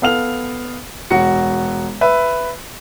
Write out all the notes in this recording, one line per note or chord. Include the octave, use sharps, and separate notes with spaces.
B3 A4 F5 F6 F7
E1 F#4 C#7
B4 E5